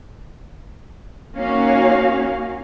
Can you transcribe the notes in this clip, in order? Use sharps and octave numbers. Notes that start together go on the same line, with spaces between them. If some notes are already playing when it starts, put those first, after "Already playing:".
A#3 C#4 D#4 F#4 C#5 F5